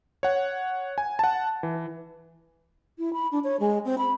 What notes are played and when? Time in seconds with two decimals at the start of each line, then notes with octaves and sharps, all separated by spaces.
0.23 C#5 F#5
0.98 G#5
1.19 F#5 A5
1.63 E3
2.99 E4
3.13 B5
3.32 D4
3.44 C#5
3.60 G#3
3.85 C4
3.98 B5